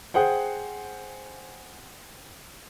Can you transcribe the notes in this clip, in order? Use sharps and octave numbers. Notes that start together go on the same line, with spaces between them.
G#4 C5 F#5 G5